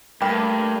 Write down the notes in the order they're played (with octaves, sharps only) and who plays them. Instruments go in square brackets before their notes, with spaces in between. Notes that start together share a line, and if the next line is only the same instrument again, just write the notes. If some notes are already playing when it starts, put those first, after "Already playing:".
[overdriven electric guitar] G2 [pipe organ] A3 [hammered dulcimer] A#3 B4 [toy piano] G5 B5